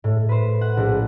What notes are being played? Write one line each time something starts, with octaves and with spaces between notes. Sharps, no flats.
A2
B4 C5
F#5
A#1